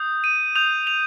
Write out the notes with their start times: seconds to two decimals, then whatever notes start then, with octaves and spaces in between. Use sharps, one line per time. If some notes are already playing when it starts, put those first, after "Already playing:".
Already playing: D#6 G6
0.24 D#7
0.55 D#6 G6 F7
0.87 F7